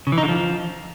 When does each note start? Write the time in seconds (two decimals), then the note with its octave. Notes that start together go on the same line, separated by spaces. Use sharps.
0.07 C#3
0.12 E3
0.18 D#4
0.23 D3
0.29 F3